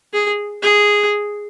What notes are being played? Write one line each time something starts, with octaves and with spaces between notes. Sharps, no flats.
G#4
G#4